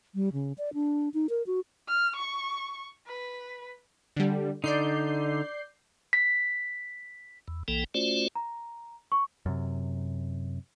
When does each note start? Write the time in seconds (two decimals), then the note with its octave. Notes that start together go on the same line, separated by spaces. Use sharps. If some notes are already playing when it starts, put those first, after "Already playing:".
0.15 G3
0.33 C#3
0.58 D5
0.74 D4
1.14 D#4
1.29 A#4
1.47 F#4
1.88 F6
2.16 C#6
3.07 B4
4.16 D3 G3
4.64 D3 D#4 D5 G6 C7
6.13 B6
7.48 E2
7.68 B1 E3 A#3 A4 G5
7.94 A3 C#4 F4 F#4 C5 D5
8.35 A#5
9.12 C#6
9.46 F#2 C3